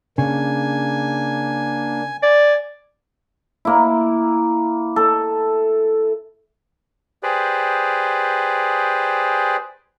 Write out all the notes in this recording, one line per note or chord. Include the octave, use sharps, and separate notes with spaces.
C#3 A#3 D4 G#5
D5 G#5
A#3 E4
A4
G4 G#4 B4 C5 D5